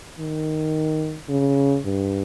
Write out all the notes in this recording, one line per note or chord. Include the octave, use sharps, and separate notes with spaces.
D#3
C#3
G2